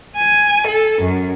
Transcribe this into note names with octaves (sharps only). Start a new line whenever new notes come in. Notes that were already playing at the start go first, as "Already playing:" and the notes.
G#5
A4
F#2